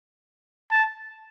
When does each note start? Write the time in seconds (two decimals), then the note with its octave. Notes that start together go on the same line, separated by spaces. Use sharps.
0.71 A5